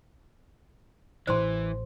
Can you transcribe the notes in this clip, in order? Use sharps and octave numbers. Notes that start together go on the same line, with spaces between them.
A1 E3 C5 C6